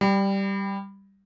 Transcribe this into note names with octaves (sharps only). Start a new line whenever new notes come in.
G3